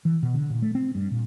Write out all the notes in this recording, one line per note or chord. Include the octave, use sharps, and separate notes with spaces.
E3
B2
D3
A#2
A3
C4
G2
A#2